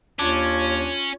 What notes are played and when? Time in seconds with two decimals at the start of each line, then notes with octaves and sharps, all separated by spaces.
0.19 D#2 C#4 D4 F4 C#5